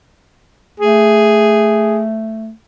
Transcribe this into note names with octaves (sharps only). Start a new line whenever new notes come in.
A3 G#4